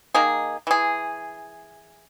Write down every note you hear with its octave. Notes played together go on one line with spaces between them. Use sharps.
D#3 A#3 D#4 G#4
E3 G#4